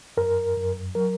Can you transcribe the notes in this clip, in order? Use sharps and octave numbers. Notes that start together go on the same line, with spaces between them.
F#2 A#4
F#2
F#3 A#4